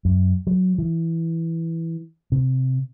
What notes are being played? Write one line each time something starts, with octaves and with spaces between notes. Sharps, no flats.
F#2
F#3
E3
C3